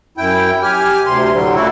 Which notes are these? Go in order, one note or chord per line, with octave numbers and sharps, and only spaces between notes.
F#2 E4 G5
G4 G#5 F6
D2 C3 C6
A2 D3 F#3 G3
A#2 C#3 A3 E4 F#4 A4